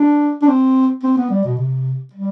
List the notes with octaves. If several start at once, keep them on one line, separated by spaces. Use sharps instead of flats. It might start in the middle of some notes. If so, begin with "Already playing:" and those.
Already playing: D4
D4
C4
C4
B3
G3
B2
C3
G3